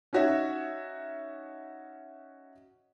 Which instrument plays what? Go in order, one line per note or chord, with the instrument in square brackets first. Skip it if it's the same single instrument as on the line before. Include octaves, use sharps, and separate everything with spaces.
[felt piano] C#4 D#4 F#4 C#5 E5